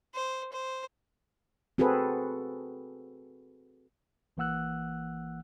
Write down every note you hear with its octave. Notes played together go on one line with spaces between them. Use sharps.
C5
C5
C4 F#4 G#4 A4 B4
G#1 E3 A#3 F#5 E6 F#6